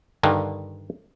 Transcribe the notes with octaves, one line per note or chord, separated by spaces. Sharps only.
G2 D3 D#3